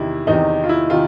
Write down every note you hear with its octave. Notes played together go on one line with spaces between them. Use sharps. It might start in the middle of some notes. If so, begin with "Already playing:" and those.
Already playing: E2 C3 D#3 E4
E2 C3 D#3 D#4
F4
E4
C3 D#3 F4